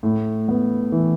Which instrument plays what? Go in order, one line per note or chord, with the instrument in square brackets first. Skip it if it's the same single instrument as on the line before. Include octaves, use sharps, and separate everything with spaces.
[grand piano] A2
B3
E3